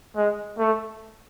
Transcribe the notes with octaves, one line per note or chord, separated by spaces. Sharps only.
G#3
A3